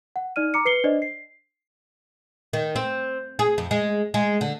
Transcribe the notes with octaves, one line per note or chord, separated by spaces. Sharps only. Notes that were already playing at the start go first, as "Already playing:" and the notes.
F#5
D#4 D5 F6 D#7
A#5 D6 C#7
B4 C7 C#7 G7
D4 C5 D5 D#5
C7
D#3
C4
G#4
F2
G#3
G#3
D3